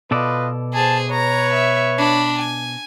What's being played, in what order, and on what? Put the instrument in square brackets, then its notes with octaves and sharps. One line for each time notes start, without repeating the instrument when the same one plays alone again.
[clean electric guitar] B2 A4 D5 [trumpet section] F4 B4 D#5
[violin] G#4 C5 [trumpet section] G#5 A5
[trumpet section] B4 C#5 [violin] A#5
[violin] E5
D4 B5
G#5